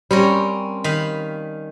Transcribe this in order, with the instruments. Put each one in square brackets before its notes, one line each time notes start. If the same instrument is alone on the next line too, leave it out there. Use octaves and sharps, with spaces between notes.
[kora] G3 C#5 [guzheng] C4 C#4 A#4
[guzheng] D#3 F5 B5